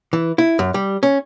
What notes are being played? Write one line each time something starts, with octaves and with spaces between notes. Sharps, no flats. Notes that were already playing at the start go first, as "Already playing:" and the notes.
E3
E4
F#2
G3
C#4